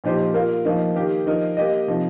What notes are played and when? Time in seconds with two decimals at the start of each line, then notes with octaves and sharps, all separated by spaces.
0.04 A#2 F3 D#4 G4 C5
0.34 A#3 F4 A#4
0.65 F3 A#3 D#4
0.95 D#3 A#3 G4
1.26 F3 D#4 A#4 D#5
1.57 A#3 G4 D#5
1.87 C3 F3 D#4